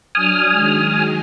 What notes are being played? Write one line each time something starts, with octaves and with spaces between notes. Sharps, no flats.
F#3 D4 G#5 D#6 F6
D#3 F#3 G#3